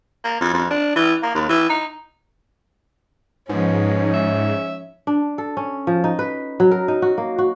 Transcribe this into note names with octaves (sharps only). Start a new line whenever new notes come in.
A#3
F2
F2
D4
E3
A#3
D#2
E3
D#4
G#2 F3 B3 C#4 D#4
E5
D4
A4
C#4
F3
D#4
B4
F#3
A#4
D#4
F#4
A#3
F#4